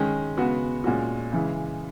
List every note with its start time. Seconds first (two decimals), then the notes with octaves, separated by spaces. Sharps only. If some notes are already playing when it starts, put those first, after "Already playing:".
Already playing: D#3 G#3 C#4
0.37 C#3 G#3 B3 F#4
0.84 A#2 G#3 C#4 F#4
1.32 C#3 E3 G#3